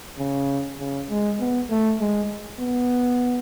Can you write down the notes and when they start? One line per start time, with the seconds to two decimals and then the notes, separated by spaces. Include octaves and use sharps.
0.19 C#3
0.80 C#3
1.10 G#3
1.40 B3
1.70 A3
2.01 G#3
2.60 B3